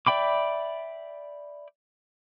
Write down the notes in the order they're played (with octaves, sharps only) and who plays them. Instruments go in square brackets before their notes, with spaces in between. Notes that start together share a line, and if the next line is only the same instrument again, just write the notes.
[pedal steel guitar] D5 E5 G5 B5 D6